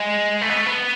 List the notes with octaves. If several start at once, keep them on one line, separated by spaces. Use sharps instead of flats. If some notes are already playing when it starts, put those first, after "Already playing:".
Already playing: G#3
A3
B3
A3
B3